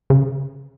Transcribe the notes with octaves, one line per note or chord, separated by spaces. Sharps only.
C#3